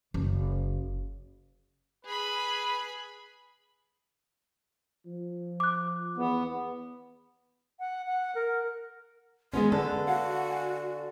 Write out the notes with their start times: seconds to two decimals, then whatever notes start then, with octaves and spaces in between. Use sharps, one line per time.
0.14 F#1
2.05 G#4 B4 B5
5.06 F3
5.60 D6 F#6
6.17 E2 B3
7.80 F#5
8.07 F#5
8.35 A#4
9.54 G#3 B3 C#4 F#4 G#4 C6
9.72 D3 A4 B4
10.07 F#4 C#5 F5 F#5
10.51 F5 G#5